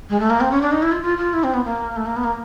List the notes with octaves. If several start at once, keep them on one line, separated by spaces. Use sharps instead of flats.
G#3
A3
A#3
C4
C#4
D4
D#4
E4
F4
F4
F4
E4
C4
B3
A#3
A3
A#3
B3
A#3